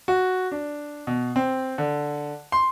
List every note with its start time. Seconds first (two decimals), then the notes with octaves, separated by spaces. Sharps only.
0.08 F#4
0.52 D4
1.07 B2
1.36 C4
1.78 D3
2.52 C6